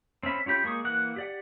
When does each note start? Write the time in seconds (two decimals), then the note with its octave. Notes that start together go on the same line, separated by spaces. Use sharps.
0.23 C4 C#4 E5 B5
0.46 C#4 F4 G4 B5 G6
0.63 G#3 A#3 G#4 C#6 D#6
0.85 E3 A#3 F#5 F#6
1.16 G4 D5 F#5